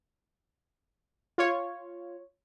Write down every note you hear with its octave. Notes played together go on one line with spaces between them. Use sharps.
F4 C#5